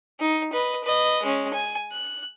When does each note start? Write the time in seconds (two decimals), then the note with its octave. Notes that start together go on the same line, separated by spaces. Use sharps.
0.20 D#4
0.53 B4 D#5
0.84 B4 D#5
1.23 G#3 C#4
1.53 G#5
1.92 F#6